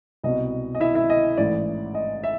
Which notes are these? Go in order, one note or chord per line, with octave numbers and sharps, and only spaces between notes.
C2 B2 D#5
D#5
E4 E5
E4 E5
D#5
A1 G#2 E3 D5
D#5
E5